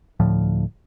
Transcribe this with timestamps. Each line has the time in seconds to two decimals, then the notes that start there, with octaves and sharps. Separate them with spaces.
0.20 D2 A2 F3